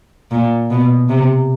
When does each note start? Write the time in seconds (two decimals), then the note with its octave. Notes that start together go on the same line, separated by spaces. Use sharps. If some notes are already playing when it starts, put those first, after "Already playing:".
0.31 A#2
0.70 B2
1.09 C3